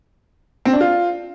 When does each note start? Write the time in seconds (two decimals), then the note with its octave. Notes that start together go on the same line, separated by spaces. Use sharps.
0.65 C4
0.73 D4
0.81 F4